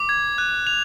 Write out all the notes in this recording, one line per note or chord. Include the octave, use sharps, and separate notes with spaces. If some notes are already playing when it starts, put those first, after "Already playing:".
Already playing: D6
G#6
F#6
F7